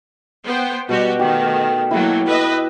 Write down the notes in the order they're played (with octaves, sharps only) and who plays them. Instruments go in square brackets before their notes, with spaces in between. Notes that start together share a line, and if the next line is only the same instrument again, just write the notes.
[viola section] B3 C5 G5
[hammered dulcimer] B2 [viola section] G3 F#4 G4
[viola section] D#3 A3 [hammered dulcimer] G4
[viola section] F#3 A3 A#3 [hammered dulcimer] E4
[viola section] B4 D#5 E5